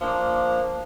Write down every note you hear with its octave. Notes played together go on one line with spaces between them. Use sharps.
F3 A#3 D4